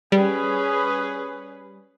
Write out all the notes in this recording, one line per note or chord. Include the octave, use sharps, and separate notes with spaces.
G3 C#4 G#4 B4